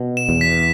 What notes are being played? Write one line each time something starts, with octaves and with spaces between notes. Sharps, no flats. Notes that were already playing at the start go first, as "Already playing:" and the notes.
Already playing: B2
E7
E2
B6